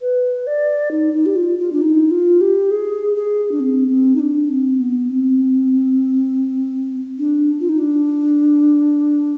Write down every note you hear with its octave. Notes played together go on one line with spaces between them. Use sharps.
B4
D5
D#4
D#4
G4
F4
F4
D4
D#4
F4
G4
G#4
G#4
D4
C4
C4
D#4
D4
C4
B3
C4
D4
F4
D#4
D4